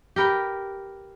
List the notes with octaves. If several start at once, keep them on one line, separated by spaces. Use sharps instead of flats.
G4 A#4 B4 G5